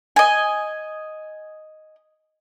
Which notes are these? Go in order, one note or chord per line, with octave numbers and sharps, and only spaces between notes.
D#5 G#5